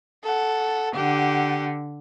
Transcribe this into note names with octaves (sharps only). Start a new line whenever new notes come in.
A4 F#5
D3 G4 F#5